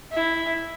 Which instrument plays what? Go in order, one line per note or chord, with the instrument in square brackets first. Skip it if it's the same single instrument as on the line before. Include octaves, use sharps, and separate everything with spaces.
[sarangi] E4